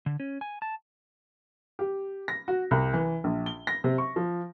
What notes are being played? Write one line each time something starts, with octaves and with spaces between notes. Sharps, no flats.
D3
C#4
G#5
A5
G4
A#6
F#4
C2
E3
A#1
G7
A#6
C3
C#6
F3